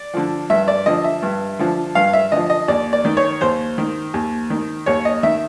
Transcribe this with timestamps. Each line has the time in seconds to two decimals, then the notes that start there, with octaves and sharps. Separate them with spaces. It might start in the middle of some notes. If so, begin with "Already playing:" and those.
Already playing: D5
0.14 D3 F3
0.50 G2 E5
0.68 D5
0.86 D3 F3 D#5
1.04 E5
1.23 G2
1.59 D3 F3
1.95 G2 F5
2.13 E5
2.32 D3 F3 D#5
2.50 D#5
2.68 D#2 D5
2.93 D5
3.05 D#3
3.17 C#5
3.41 D#2 C5
3.78 D#3
4.14 D#2
4.50 D#3
4.86 D#2 C#5
5.05 D#5
5.23 D#3 E5